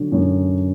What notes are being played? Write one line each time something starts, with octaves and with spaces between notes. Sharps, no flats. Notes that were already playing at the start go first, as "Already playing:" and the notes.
Already playing: D3 F#3
F#2